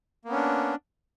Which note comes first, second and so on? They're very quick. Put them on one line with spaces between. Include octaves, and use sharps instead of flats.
A#3 B3 C#4 D4